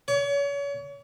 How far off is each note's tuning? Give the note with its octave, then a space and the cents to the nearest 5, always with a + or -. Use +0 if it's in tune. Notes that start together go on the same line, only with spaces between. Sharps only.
C#5 +35